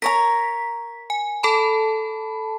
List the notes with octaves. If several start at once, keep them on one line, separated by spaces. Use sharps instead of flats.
A#4 C#5 A#5 B6
G#5
A4 A5 B5